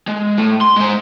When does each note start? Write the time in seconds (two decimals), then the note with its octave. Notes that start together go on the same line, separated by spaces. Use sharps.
0.07 G#3
0.38 A2
0.61 C6
0.77 G#3 C5